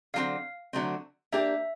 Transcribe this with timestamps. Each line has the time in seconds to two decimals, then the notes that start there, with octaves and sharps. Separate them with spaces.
0.14 D3 F#3 A3 C4 F5
0.73 D3 F#3 A3 C4
1.32 A#3 D4 G4 E5